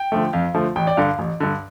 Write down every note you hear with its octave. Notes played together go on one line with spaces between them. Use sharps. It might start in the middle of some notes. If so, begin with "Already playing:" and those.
Already playing: G5
D3 F3 A3
F2 F5
D3 F3 A3
A1 G5
D5
G2 D3 F5
A1
G2 D3